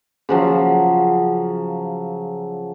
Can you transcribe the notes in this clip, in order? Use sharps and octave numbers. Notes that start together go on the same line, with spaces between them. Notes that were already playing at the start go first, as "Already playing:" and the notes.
C#3 F3 F#3